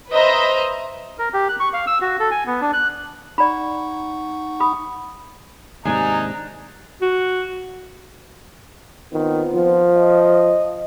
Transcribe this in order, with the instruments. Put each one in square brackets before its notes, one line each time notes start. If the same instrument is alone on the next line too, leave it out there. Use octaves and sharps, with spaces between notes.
[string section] B4 C5 D#5 E5 A#5
[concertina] A#4
G4
F#6
C#6
F5
E6
F#4
A4
G#5
B3
D4
F#6
[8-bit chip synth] D#4 F#5 C#6 [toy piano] D5 A#5 B5
[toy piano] B5 D#6
[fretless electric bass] D#2 G#2 C3 [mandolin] D4 G#5 [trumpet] D#4 [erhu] A#5
[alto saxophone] F#4
[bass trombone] D#3 [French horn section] B3 C4 F4
[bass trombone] F3
[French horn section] D#5